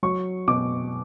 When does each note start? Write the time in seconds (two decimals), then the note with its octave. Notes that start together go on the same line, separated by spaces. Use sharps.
0.03 F#3 C#6
0.48 B2 D6